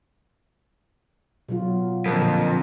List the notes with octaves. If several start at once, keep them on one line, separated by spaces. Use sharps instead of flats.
B2 F#3 F4
F2 A#2 D3 A#4